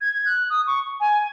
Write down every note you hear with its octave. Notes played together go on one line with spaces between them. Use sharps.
G#6
F#6
D#6
C#6
G#5